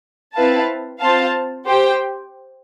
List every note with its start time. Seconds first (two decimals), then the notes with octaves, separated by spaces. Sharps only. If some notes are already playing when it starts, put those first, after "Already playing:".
0.35 C4 E4 B4 F5 A5
1.01 C4 F4 C5 F5 A5
1.66 G4 C5 G5